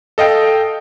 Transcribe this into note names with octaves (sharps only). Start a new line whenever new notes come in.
A4 D#5 F5 G5